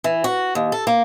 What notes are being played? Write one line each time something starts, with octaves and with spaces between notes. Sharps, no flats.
E3
F#4
D#2
A4
A#3